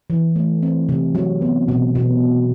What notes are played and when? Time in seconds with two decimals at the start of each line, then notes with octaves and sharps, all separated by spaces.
0.10 E3
0.36 A3
0.63 C4
0.89 C3
1.15 F#3
1.41 B3
1.68 B2
1.95 B2